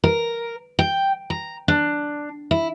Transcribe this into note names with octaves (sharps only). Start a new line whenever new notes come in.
A#4
G5
A#5
D4
E4